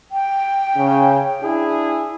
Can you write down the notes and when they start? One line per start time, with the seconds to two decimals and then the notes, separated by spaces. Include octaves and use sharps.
0.11 G5
0.77 C#3 C#4
1.43 D4 E4 G#4